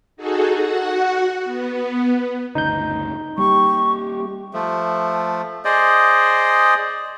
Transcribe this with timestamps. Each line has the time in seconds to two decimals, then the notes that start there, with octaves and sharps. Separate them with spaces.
0.16 D#4 F#4 G#4 A4
0.55 F#4 F#5
1.44 B3
2.55 G1 D2 C#3 D#4 G6
3.38 G3 A#3 G4 C#6
4.54 F3 A3
5.65 G#4 C5 D5 D#5